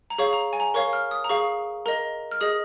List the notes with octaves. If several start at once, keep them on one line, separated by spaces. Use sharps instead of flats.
A#5
G#4 C#5 F5 C#6
A#5
G#5
A#5
A#4 C#5 F5 C#6
F6
D#6
A#5
G#4 F5 C#6
A#4 D#5 A#5
F6
G#4 D#5 D#6